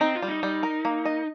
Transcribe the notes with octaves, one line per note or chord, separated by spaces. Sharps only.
C4 D#4
F4
G3
D#4
G3
A#4
A#3
D#5